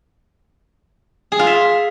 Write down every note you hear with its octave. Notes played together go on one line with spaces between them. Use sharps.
G#4
F4
E5